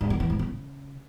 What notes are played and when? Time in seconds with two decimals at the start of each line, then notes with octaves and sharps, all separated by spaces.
0.01 G2
0.10 D#3
0.20 E3
0.30 G#2
0.39 C#3